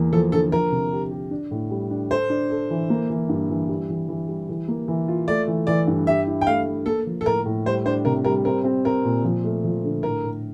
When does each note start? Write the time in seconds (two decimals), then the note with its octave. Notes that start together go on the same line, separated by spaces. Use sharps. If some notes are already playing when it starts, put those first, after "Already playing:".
Already playing: E2 A#3
0.13 F3 A4
0.32 D3 A4
0.52 F3 A#4
0.72 C3
0.92 G4
1.11 G4
1.31 D4
1.51 A2
1.71 G3
1.90 D4
2.11 A4 C5
2.30 D4
2.50 A4
2.70 E3
2.90 A#3
3.10 E3
3.29 G2
3.50 E3
3.69 G3
3.90 E3
4.09 E3
4.28 G3
4.49 E3
4.68 A#3
4.88 E3
5.08 F4
5.28 A3 D5
5.48 E3
5.67 E3 D5
5.87 G2
6.07 G4 E5
6.27 E4
6.41 G5
6.47 A3 F5
6.67 A3
6.86 A#3 A4
7.06 F3
7.21 A4
7.25 A2 A#4
7.45 A2
7.66 G3 C5
7.86 D4 C5
8.05 C3 A#4
8.25 G3 A#4
8.45 C4 A#4
8.64 C4
8.85 C4 A#4
9.05 A#2
9.24 F3
9.44 A3
9.64 F3
9.84 D3
10.03 A2 A#4
10.24 A2